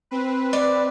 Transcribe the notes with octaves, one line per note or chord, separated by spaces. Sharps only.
C4 B4
D5